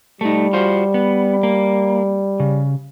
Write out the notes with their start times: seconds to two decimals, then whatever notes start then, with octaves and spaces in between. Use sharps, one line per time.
0.21 G3 A3 D#4
0.53 F4 F#4 C5
0.94 B3
1.43 A#3
2.40 C#3